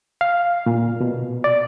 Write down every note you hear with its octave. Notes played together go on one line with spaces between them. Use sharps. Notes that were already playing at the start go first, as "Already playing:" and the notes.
F5
A#2
B2
D5